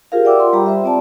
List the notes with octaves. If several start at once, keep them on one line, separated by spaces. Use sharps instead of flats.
F4 G4 G#4 A#4 C5 F5
D5 E5 F#5 G5 D6 E6
C6
G3 F4 G4 G5 A#5 B5
C5 E5
C4 D5 A5